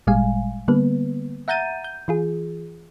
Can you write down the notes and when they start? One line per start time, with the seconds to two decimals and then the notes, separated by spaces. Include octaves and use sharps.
0.07 G#1 A#2 G3 G#3 F5 G#5
0.68 D3 G3 A#3 B3 B4
1.48 E5 F#5 A#5 G6 A6 D#7
1.84 G6
2.08 E3 F4 G#4